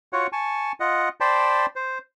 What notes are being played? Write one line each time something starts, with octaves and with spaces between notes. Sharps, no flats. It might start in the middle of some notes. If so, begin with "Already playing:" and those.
F4 F#4 C#5 F#5
G#5 A5 C#6
F4 D#5 F#5
C5 D5 G5 A5 B5 C6
C5